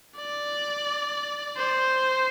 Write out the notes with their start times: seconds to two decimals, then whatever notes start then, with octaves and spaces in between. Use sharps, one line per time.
0.16 D5
1.57 C5